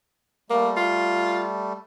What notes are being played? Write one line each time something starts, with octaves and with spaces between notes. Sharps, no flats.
G3 A3 A#3
F4